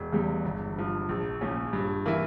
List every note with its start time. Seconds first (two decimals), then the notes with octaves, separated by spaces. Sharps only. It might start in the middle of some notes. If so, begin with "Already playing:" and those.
Already playing: E1
0.12 E2 C#3 G3
0.45 G1
0.76 G2 F3
1.09 A#1
1.41 A#2 F3 C#4
1.73 G2
2.06 E3 A#3 E4